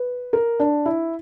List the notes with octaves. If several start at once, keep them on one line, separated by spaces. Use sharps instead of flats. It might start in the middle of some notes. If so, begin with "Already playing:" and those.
Already playing: B4
A#4
D4
E4